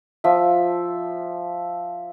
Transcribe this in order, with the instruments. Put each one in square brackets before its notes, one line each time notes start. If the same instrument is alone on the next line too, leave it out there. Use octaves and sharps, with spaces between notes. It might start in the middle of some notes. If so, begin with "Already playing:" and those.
[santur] F3 E5